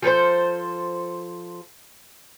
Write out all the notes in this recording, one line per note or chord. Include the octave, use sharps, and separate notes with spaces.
F3 A4 B4 C5